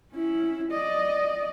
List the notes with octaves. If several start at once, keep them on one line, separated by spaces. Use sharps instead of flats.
C#4 E4
D5 D#5